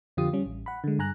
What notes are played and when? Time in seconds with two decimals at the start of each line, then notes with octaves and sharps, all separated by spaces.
0.17 F2 D3 F3 F4 G4 D#6
0.33 G3 C#4
0.46 A1
0.66 F#5 B5
0.84 D3 G#3
0.99 G2 G#5 A#5 F#6